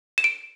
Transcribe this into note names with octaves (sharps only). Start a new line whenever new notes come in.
E7
D7